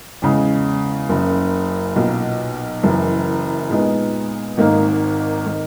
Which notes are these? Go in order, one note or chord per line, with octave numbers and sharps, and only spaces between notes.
E2 C#3 G#3
F#1 F#2 C#3
B1 A#2 A#3
F#1 F#2 E3
A#2 G#3 B3 D#4
G#1 G#2 D#3 A#3 D#4
D#3